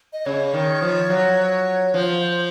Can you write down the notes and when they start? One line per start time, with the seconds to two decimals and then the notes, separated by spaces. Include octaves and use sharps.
0.13 D#5
0.26 C#3 C#5
0.54 D#3
0.82 F3
1.10 F#3
1.94 F3 C5 C#5